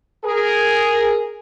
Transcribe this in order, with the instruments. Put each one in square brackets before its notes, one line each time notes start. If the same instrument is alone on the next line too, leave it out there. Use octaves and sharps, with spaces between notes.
[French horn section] G#4 A#4